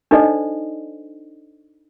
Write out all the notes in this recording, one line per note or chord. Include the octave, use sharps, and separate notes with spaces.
D4 D#4 A4 C5 D5 D#5